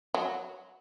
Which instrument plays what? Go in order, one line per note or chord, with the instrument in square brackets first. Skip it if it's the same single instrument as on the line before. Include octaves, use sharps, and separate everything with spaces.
[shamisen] F#3